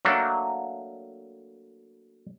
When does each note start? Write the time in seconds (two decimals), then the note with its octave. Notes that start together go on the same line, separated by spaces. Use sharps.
0.05 F#3 A3 A#3 D4